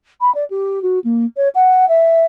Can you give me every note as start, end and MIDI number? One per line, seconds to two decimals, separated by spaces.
0.21 0.33 83
0.34 0.44 74
0.50 0.82 67
0.82 0.99 66
1.04 1.25 58
1.36 1.48 73
1.55 1.88 78
1.88 2.25 76